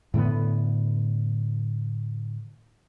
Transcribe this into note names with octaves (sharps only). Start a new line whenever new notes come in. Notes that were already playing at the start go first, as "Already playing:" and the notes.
A2 D3 A3 B3